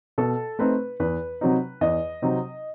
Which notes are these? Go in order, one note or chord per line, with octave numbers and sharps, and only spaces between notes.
B2 A4
A3 C4 D#4 B4
E2 B4
C3 F#3 C4 D#4
E2 D#5
C3 F#3 C4 D#4